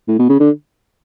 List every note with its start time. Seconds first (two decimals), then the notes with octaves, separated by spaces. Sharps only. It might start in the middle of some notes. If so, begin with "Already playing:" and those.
0.08 A2
0.19 B2
0.29 C#3
0.40 D3